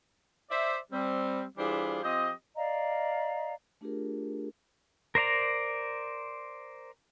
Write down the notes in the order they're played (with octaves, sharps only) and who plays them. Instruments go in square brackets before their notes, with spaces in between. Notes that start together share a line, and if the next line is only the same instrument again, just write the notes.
[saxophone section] C5 D5 E5
G3 C4
E3 G3 D4 F4 G#4 C5
F3 C4 G4 D#5
[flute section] D5 D#5 F5 A#5
[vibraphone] A3 D4 F4 G4 G#4 A#4
[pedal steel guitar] A#4 C5 D5 A#5